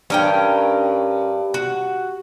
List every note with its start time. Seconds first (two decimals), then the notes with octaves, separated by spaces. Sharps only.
0.10 G2 C#4 A#4 G5
1.54 F#4